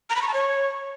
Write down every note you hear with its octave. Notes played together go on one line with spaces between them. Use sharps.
A#5
B5
C#6
A5
C#5